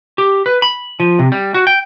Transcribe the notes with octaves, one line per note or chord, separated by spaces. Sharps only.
G4
B4
B5
F3
C3
G3
F#4
G5